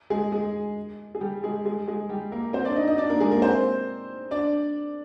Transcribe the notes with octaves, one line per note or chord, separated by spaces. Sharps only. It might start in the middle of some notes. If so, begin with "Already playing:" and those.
G#3 G#4
G#3 G#4
G#4
G3 G4
G#3 G#4
G#3 G#4
G#3 G#4
G3 G4
A#3 A#4
C4 C5
D4 D5
D#4 D#5
D#4 D#5
D4 D5
A#3 A#4
G#3 G#4
A#3 A#4
C4 C5
D4 D5